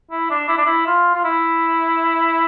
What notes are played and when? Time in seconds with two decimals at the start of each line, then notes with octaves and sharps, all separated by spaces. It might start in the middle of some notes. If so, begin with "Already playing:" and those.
0.11 E4
0.30 D4
0.48 E4
0.58 D4
0.66 E4
0.87 F4
1.15 F4
1.24 E4